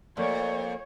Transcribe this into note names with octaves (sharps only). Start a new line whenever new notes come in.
F2 F3 A3 A#3 C#5 D5